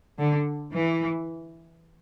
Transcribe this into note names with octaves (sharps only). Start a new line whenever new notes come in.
D3
E3